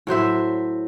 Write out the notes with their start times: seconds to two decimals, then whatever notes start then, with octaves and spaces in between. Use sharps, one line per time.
0.07 A2 F#3 C5 E5